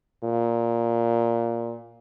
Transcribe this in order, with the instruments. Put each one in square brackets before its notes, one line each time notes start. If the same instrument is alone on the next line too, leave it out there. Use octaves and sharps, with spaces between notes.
[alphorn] A#2